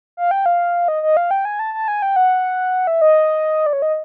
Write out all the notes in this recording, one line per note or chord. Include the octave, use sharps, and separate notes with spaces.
F5
G5
F5
D#5
D#5
F5
G5
G#5
A5
A5
G#5
G5
F#5
E5
D#5
D5
C#5
D#5